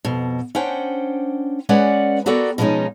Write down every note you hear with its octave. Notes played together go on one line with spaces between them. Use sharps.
F2 B2
C#4 D4 C5 F#5 G5
G#3 C#4 B4 D5 F#5
B3 F#4 A4 A#4 D5 G5
B2 F3 G#3 B3 C#4 D#4